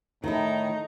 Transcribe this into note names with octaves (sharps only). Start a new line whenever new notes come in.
A2 D#3 D#4 E4